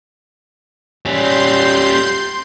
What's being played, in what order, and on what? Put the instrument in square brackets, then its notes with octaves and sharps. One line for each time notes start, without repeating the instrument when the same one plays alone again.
[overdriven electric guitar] G3 C#4 [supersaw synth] C6 G6